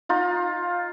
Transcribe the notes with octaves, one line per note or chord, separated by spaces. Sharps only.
D#4 F4